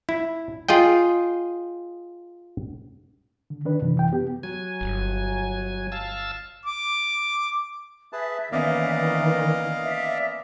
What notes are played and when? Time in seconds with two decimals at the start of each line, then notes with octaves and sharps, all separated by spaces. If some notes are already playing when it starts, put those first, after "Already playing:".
0.09 E4
0.69 F4 G#4 D#5 G5
3.50 D3
3.65 D#3 D4 B4
3.82 F#2 C3 E3
3.98 F#2 E3 G5
4.13 B3 G4
4.43 F#3 G#5
4.81 G1
5.92 F5 A5 E6
6.65 D6
8.13 G#4 B4 E5 A5
8.52 D#3 E3 A#3 B3 C#4 D5 D#5 F5
9.84 E5